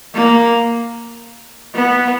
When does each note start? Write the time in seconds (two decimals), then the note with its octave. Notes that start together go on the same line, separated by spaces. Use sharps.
0.15 A#3
1.75 B3